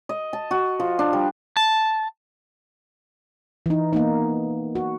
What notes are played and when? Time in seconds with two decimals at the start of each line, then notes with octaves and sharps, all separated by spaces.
0.09 D#5
0.33 A5
0.51 F#4
0.80 F3
0.99 D4
1.13 G3
1.57 A5
3.66 E3 D#4
3.93 A#3 B3 D#4
4.75 F#4